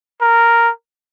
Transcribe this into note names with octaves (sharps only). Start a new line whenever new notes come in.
A#4